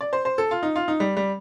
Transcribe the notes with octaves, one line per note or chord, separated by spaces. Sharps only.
D5
C5
C5
A4
F4
D#4
F4
D#4
G3
G3